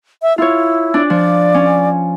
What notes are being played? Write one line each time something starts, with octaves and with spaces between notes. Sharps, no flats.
E5
E4 F4 C#5
D4 D5
F3 D5
C#4